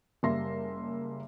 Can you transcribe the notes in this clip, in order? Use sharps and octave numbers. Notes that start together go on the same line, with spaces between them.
F#1 G3 A#3 E5 C6 A#6